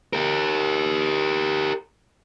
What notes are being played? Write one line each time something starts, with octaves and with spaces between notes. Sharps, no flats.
G4 A#4